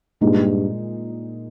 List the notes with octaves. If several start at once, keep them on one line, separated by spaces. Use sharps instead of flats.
G2 A#2 G#3 D#4